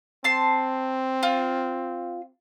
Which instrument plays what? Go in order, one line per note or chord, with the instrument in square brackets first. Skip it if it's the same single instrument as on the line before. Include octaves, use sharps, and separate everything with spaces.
[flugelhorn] C4 [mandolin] A5 C6
[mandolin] F4